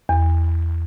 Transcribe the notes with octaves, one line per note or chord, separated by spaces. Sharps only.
E2